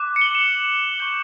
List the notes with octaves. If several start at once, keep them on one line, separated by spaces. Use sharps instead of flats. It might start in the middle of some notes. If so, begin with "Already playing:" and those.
Already playing: D6 F#6
C#7
G7
F#7
E7
F#7
C#6 G6 G7